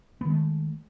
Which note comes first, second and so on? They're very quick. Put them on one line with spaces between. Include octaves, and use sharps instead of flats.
B3 D#3 G#3 A3